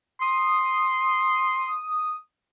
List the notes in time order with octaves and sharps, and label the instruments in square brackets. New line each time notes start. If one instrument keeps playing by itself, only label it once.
[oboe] C6 [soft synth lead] D#6